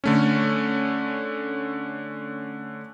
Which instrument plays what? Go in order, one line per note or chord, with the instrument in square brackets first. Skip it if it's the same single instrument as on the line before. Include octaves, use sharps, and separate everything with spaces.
[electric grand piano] D3 A3 C#4